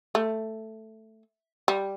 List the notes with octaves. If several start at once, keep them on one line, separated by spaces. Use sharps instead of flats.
A3
G3